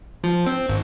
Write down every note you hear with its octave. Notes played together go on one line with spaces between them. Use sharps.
F3
C4
G#1